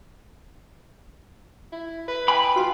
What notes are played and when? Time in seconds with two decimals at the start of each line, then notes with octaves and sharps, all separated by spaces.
1.72 E4
2.08 B4
2.28 G5 G#5 B5
2.56 F4 F#4 C6